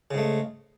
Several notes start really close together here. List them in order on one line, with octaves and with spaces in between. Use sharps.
C#3 G#2 A3